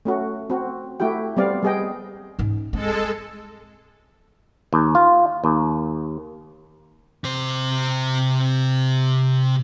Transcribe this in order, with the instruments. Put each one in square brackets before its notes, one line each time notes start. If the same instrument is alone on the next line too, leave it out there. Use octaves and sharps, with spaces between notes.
[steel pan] A3 C#4 F#4
C4 F#4
A3 E4 F#4 G4 G5
G3 B3 C4 D5 F5
G3 B3 G#4 D#5 G5
[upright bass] G#2 C#4
[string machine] G#3 A4 [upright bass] C4
[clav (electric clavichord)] D#2
F4
D#2
[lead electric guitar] C3 C5